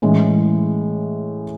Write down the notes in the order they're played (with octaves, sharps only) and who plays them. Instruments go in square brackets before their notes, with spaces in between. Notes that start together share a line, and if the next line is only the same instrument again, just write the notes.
[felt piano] A2 E3 G#3 C#4